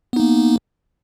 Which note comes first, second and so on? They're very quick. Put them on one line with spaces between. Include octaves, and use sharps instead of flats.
B3 D#4 A#3